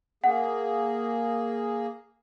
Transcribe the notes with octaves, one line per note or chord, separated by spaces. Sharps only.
A#3 G#4 F#5